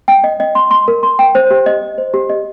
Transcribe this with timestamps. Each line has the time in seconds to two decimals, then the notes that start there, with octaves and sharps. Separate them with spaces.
0.08 G5
0.24 D#5
0.40 D#5
0.55 C6
0.71 C6
0.88 A#4
1.03 C6
1.19 G5
1.35 C5
1.51 G4
1.66 D#5
1.83 D#5
1.98 C5
2.14 G4
2.29 D#5